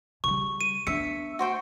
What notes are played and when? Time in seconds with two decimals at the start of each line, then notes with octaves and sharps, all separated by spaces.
0.24 C#3 G3 C#6
0.61 D#7
0.87 B3 D4 E5 C#7
1.39 F#4 C5 G5